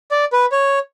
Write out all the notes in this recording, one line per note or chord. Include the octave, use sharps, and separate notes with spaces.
D5
B4
C#5